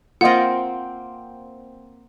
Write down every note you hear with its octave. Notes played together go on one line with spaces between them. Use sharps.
A#3 C4 F4 D#5 F#5